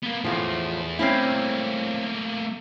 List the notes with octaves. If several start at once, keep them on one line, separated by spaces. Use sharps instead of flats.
A#3 B3
E2 A2 F3
A3 A#3 C4 C#4 E4